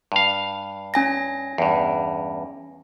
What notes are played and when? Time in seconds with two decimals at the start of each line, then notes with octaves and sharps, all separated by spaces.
0.12 G2 F5
0.94 C#4 G#5 A#6
1.58 E2 G2